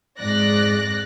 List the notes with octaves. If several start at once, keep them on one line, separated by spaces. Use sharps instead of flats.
F2 G#2 D5 F#6 A#6